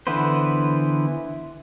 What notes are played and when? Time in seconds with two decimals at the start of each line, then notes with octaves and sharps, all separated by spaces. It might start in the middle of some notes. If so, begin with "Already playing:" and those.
0.07 D3 E3 B3 B4 C5